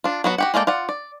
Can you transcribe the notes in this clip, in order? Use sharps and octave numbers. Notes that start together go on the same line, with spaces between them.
D4 F4
F#3 B3 F#4
F#4 G4 F#5
G#3 A#3 A4 D5 G5
F4 D5 F#5
D5